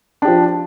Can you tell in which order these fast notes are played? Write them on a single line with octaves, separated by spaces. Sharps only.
D4 G4 F3